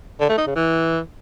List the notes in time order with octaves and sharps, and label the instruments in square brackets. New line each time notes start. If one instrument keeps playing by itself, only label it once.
[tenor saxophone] D3
A3
D#4
C#3
E3